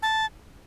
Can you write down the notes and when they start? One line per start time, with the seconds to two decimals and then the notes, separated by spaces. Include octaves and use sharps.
0.02 A5